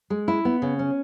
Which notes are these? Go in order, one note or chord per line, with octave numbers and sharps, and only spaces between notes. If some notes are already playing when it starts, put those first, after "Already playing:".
G#3
E4
B3
C#3
C#4